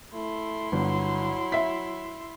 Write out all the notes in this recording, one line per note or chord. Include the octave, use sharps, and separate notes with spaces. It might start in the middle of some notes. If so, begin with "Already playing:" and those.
A3 E4 C6
G1 F#3
E5 B6